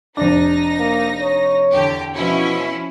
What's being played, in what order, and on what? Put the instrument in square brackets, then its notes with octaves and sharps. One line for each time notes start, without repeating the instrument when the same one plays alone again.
[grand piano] F1 D4 [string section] D#4 A#6
[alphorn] A#3
C#5
[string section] E2 D3 G4
[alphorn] B2 [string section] F3 C#4 E4